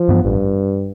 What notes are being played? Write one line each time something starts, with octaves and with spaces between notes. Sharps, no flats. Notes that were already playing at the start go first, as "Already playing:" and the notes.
Already playing: F3
G2 E3 B3
A1 G2